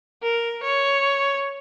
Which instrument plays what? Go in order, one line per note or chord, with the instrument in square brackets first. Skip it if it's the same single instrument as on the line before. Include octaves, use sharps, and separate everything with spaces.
[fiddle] A#4
C#5